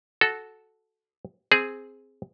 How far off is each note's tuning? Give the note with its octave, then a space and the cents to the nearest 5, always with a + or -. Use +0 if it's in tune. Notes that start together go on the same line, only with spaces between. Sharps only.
F#4 +0 A4 -10
C4 +0 G#4 +0